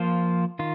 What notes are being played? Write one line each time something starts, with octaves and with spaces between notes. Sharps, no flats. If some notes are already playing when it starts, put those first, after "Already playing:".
Already playing: F3 A#3 F4 C5
D#3 F4